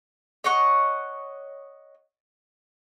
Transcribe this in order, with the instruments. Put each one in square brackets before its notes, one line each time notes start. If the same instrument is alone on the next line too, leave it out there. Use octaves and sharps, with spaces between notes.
[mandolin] C#5 D#5 F#5 C#6